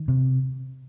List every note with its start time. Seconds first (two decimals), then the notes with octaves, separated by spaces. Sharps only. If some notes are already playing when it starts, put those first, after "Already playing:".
Already playing: D#3
0.08 C3